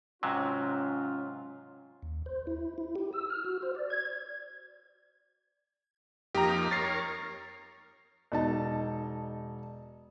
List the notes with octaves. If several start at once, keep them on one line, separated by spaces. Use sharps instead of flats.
G#2 C3 F#3 C#4 F4
D#2
C5
E4
E4
G4
E6
F6
F#4
C5
D5
G#6
F2 A#3 D#4 G4 A#5
A#4 C#5 A6 C7
E1 D#4 A5